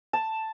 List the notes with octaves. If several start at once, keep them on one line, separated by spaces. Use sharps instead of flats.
A5